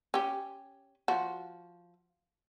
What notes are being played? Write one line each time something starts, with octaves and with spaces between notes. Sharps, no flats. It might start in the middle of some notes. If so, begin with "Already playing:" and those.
C#4 G4
F3 F#4